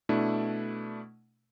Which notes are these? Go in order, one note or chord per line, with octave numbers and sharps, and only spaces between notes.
B2 A3 D4 E4